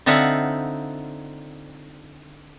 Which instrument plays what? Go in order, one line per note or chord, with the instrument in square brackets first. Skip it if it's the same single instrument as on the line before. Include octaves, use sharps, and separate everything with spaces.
[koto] D3 C4 D#4 F4 E5 F#5